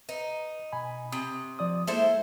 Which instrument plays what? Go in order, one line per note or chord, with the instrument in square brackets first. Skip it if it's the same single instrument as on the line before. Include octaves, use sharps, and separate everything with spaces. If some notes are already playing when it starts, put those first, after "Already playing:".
[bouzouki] D#4 [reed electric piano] B4
[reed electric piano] B2 G#5 B5
[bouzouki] C3 [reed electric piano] D#6
[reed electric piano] F3 D5 D#6
[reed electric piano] G#3 A#3 [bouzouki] E4 A4 C5